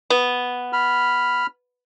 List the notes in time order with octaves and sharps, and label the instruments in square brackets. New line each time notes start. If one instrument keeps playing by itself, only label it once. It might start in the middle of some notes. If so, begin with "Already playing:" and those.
[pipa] B3
[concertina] B5 F6